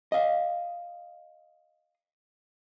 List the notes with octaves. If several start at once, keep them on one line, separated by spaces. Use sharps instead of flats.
D#5 F5